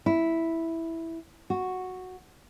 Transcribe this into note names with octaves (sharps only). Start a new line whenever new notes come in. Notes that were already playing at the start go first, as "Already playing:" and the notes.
E4
F#4